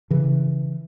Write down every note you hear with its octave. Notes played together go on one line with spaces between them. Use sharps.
C#3 E3